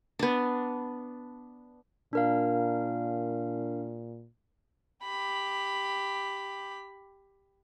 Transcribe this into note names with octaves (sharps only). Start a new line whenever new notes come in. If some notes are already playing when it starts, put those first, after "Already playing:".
B3 D4
A#2 D4 A#4 F5
G4 B5